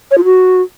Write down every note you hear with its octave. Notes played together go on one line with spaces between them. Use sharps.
C#5
F4
F#4